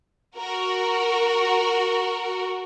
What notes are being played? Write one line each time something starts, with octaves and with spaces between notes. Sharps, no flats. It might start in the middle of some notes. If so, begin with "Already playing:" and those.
F#4 A#4